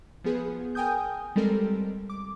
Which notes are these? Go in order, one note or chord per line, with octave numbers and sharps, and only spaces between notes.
F3 B3 G#4 B4
A#4 G5 G#5 D#6 G6
G3 G#3 C4 A4 A#4
D6